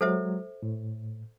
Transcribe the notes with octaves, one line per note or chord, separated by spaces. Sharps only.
F#3 G#3 A4 C5 E5
A2